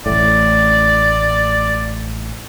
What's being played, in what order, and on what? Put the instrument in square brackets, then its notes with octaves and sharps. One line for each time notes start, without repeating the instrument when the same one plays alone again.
[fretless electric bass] A1 A2 [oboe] D5